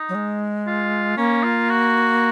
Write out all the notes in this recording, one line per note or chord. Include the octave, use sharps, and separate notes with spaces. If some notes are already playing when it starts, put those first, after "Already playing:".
Already playing: D#4
F#3
G#3
F4
A#3 C#4
F4
F#4